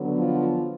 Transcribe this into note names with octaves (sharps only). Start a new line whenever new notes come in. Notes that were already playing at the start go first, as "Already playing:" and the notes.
Already playing: D3 F#3 B3
F3 F4